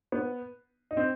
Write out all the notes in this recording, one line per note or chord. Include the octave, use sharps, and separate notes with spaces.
B3
D#4
C4